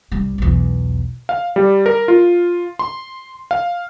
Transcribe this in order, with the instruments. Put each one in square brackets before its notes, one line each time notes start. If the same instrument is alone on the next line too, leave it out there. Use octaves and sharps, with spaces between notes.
[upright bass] C2 G3
B1 E2
[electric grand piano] F5
G3
A#4
F4
C6
F5